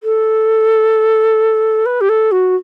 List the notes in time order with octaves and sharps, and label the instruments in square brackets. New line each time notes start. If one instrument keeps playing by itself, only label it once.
[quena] A4
B4
G4
A4
F#4